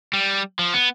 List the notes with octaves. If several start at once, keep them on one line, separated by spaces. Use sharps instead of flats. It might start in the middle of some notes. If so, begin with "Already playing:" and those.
G3
F3
B3